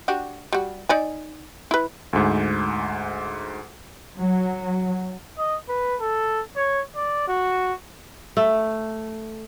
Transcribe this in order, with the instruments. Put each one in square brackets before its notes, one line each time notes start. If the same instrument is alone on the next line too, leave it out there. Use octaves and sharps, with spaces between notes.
[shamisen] D4 F#4 G4
G3 F#4
D#4 D5 G#5
E4 B4
[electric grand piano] D2 G#2
[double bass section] F#3
[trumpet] D#5
B4
A4
C#5
D5
F#4
[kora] A3